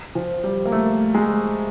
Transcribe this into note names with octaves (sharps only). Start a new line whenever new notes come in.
F3
G3
A#3
A3
G#3